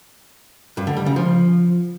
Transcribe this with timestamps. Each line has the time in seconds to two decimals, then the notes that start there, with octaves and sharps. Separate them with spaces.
0.77 G2
0.87 D3
0.97 G3
1.06 C#3
1.16 F3